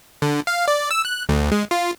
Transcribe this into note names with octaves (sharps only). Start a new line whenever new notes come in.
D3
F5
D5
E6
F#6
D2
G#3
F4